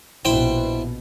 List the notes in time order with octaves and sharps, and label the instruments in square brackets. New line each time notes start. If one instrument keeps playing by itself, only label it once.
[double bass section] A#1 B2 [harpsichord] E4 C5 G5